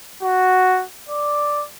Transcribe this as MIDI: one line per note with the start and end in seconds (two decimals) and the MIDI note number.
0.22 0.84 66
1.09 1.64 74